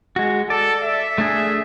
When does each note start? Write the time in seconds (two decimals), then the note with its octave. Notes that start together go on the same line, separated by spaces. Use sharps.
0.16 G#3 F#4
0.50 A4 D5
0.83 E5
1.18 A3 D4 G#4